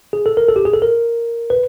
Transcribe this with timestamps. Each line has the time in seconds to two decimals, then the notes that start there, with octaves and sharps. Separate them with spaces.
0.13 G#4
0.26 A4
0.37 A#4
0.49 A4
0.56 G4
0.65 G#4
0.74 A4
0.82 A#4
1.50 B4